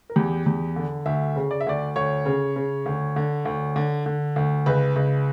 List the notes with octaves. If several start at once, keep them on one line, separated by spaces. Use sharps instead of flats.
A#4
E2 G4
E2
D3
D2 E5
C#3
D5
E5
D2 D5
D2 C#5
C#3
C#3
D2
D3
D2
D3
D3
D2
C#2 B4
C#2